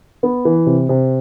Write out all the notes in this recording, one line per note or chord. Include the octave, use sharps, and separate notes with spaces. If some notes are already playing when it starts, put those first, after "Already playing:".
B3
E3
C3
C3